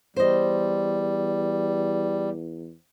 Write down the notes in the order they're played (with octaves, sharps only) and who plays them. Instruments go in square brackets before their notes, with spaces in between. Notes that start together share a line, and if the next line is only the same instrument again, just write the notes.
[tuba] E2 [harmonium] G3 [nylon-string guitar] C5 D#5